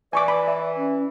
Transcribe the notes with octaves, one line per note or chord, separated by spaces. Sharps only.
E3 D5 G#5 C#6 D6
B5
E5
C#4